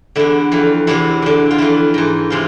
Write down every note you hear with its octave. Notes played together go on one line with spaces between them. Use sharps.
E2 D3 E4
F2 E3
E2 C3 E3 E4
E2 D3
F4
F2 E3 E4
G#2 E3
C3 E3 F4